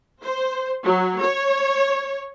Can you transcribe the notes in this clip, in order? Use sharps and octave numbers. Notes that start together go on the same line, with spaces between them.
C5
F#3
C#5